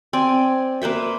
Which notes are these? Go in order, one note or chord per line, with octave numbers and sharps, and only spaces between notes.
C4 D5 G#5
A#3 B4 C5 E5